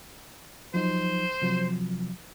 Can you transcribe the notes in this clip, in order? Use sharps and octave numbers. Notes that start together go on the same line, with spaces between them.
F3 F#3 D#4 C5
C3 F3 F#3